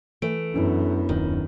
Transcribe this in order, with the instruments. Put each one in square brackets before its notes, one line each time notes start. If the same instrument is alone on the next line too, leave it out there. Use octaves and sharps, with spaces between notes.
[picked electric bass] E3 [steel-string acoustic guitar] A3 [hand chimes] D7
[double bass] F#2 B3 [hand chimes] C#4 D4 E4
[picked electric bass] D#1 [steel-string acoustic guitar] D#3